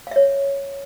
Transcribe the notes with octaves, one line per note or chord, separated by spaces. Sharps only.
C#5 E5 F5